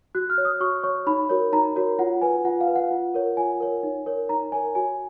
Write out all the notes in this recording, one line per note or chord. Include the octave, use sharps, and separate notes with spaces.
F#4 F#6
F6
C#5
D#6
F#4 C#6
C#5 C#6
D#4 B5
F#4 A#4 C#5
D#4 A#5
F#4 A#4 C#5
F4 F#5
B4 G#5
F4 F#5
F5
B4
F#5
F4
A#4 C#5
F4 G#5
A#4 C#5
D#4
A#4 C#5
D#4 A#5
A#4 C#5 G#5
F#4 G#5